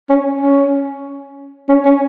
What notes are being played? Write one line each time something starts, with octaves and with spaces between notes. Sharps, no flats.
C#4
C#4
C#4
C#4